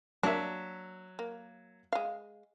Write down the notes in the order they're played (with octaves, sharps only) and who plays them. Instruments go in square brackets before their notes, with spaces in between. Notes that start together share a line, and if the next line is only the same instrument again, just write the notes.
[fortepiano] F#3 E5 [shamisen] A#3 D4
[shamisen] A#3
G#3 F5